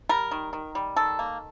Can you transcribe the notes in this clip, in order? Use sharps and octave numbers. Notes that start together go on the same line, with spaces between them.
G3 A#4
D#3
D#3
G3
D#3 A4
A#3